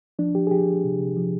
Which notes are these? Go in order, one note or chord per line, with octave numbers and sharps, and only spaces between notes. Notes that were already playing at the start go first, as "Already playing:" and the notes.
F3 D4
F3 G4
G#4
F3 G4
F3
C3
C3
F3